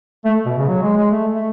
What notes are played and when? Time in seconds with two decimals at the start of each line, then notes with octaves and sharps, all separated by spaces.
0.25 A3
0.46 B2
0.58 C#3
0.68 F#3
0.82 G#3
0.97 G#3
1.11 A3
1.33 A3